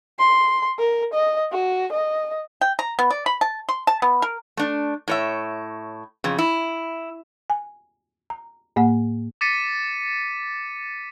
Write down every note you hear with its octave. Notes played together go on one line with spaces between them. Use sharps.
C6
A#4
D#5
F#4
D#5
G5
A#5
B3
D5
B5
A5
C6
A5
B3
A#4
A3 D4
A2 C#5 E5
F2 C#3
E4
G#5
A#5
A2 A#3 F#5
D6 A6 B6 C#7 D#7